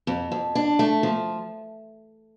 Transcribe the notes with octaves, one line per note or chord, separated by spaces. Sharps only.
F2
F2
D4
A3
F3